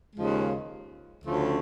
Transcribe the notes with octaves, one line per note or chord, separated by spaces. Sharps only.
D#2 C#3 F3 G#3
D2 C#3 F3 A3 C#4